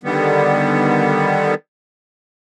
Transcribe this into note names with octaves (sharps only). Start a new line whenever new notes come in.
D3 D#3 G3 B3